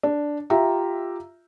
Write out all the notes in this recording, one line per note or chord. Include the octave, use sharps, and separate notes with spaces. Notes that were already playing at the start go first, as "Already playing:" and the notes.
D4
F4 G4 E5 A#5